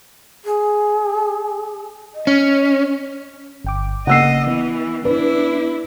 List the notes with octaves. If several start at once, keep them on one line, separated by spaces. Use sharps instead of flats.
G#4
D#5
C#4
G1 G5 D6
C#3 A#3 D#5 F#5 E6 C7
E3 B3
D4 E4 B4